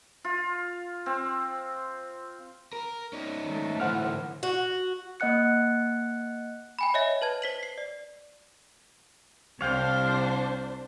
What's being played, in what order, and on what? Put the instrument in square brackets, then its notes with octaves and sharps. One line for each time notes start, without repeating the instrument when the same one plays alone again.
[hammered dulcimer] F4
C4
[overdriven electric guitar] A#4
C#4 D#4
[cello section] D#3 A3
[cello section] A2 [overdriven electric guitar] D3 E3 [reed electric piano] C5 F#5 F6
[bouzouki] F#4
[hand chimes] A#3 D#5 F#5 F#6 C#7
[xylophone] G5 G#5 B5
C#5 D#5 E5 G#5
B4 A5 G#6
C5 B6 F#7
C7
D5
[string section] C2 D4 [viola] C5 [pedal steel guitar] C#5 F5 G5